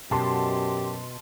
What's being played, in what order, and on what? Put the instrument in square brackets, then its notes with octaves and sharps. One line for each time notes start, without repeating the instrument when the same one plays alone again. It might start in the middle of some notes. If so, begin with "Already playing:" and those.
[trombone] F#2 [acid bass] B2 [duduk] G4 [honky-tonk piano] A5 C6